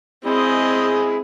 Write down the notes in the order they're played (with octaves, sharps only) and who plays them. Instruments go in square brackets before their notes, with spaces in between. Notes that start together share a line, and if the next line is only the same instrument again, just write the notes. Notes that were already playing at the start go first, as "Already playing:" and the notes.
[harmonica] G#3 E4 G#4 [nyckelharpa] C4 D#5